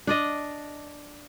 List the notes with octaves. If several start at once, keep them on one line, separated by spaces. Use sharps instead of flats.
D4 D5 D#5